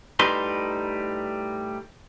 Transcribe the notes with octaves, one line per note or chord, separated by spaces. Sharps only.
A2 G3 D#4 B4 C6